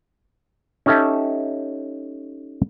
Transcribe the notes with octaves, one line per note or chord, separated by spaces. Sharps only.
C#4 D#4 G4 A4 E5 A5